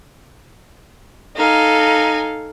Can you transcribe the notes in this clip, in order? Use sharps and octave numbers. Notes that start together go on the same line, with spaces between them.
D#4 A4 F5 G#5